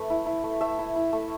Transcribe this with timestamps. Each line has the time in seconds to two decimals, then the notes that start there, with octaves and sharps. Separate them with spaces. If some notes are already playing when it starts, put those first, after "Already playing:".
Already playing: A3 B4
0.10 E4
0.26 E4
0.44 A3
0.61 A3 E5
0.78 E4
0.96 E4
1.12 A3